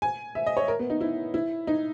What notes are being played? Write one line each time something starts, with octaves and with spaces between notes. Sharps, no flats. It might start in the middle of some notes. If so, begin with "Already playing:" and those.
G#5
E5
D#5
C#5
A#4
B3
D#4
E4
E4
D#4